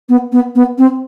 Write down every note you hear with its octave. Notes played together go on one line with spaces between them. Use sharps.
B3
B3
B3
C4